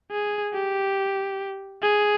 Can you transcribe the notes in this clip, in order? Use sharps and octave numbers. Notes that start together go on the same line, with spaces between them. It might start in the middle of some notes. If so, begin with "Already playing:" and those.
G#4
G4
G#4